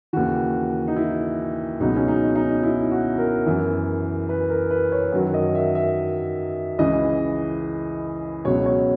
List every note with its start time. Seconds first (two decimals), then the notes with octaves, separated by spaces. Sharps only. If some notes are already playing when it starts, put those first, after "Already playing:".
0.13 D#2 C#3 E3 F#4
0.88 D#4
0.96 E4
1.80 C#2 B2 F#3 D#4
1.96 C#4
2.08 D#4
2.36 D#4
2.63 E4
2.91 F#4
3.18 A#4
3.46 F#2 E3
4.29 B4
4.50 A#4
4.70 B4
4.92 C#5
5.12 F#2 D#3 F#3
5.34 D#5
5.55 E5
5.75 E5
6.78 C#2 C#3 E3 D#5
8.45 C#2 B2 F#3 C#5
8.66 C#5